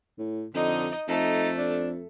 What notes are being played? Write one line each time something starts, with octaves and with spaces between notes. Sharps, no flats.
A2
F2 D3 D#4 D#5
F2 A3 D#4 A4
D4